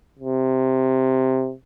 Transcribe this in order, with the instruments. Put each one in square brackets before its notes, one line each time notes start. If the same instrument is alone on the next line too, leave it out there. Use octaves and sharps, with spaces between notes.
[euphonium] C3